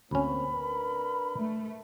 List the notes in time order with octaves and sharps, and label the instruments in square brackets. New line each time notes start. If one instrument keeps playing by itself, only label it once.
[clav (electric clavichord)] D2 C#4 [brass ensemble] A#3 C4 [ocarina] B5
[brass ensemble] D4 A#4 B4
[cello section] A3